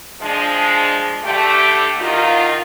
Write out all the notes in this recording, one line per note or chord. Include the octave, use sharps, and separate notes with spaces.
F3 G#3 D4
D3 A3 G4
E2 D#3 D#4 F4